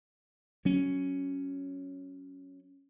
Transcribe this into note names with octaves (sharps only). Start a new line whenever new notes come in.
F#3 C#4